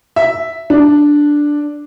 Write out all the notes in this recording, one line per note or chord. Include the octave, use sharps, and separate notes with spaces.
E5
D4